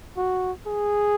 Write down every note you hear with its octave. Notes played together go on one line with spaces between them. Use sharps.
F#4
G#4